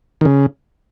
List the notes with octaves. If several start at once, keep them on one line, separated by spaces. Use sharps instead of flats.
D#3
C#3